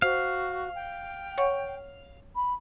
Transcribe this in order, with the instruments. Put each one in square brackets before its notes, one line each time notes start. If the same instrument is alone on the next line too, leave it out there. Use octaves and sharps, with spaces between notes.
[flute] F#4 [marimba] C5 [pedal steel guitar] F5
[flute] G5
[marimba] C#5 F#5 C#6
[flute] B5